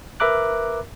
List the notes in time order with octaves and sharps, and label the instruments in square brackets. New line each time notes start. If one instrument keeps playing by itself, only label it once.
[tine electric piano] A#4 B4 E5 A#5 D6 F#6